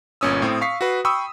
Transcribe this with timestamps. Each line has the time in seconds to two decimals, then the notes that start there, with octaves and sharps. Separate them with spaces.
0.21 G1 A#2 C#4 D#6 E6
0.42 A2 C4
0.61 F5 C#6 B6 C7
0.81 F#4 B4
1.05 G5 B5 C#6 D#6 E6